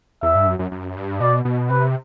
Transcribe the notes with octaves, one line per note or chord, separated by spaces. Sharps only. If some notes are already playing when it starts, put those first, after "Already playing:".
E2 E5
G2
F#2
F#2
F#2
G2
B2 D5
B2
C3 B4